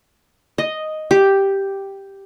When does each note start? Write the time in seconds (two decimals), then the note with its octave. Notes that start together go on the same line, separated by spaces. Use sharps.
0.58 D#5
1.11 G4